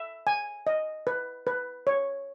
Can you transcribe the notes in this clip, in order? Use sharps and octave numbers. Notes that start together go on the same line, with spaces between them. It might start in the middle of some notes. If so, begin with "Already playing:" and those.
Already playing: E5
G#5
D#5
B4
B4
C#5